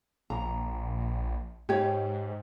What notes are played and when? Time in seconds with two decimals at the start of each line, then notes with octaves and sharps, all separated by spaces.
0.30 A#1 A#5
1.69 G#2 G4 C#5